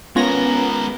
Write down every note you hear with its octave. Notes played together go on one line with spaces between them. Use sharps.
G#3 B3 C#4 F4 A#4 C#5 A#6